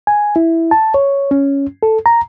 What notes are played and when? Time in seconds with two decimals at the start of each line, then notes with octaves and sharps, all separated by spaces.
0.07 G#5
0.36 E4
0.71 A5
0.94 C#5
1.31 C#4
1.83 A4
2.06 A#5